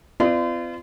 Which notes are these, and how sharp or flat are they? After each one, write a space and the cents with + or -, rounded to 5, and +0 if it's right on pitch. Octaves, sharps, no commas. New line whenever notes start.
C4 -40 F4 -35 D5 +30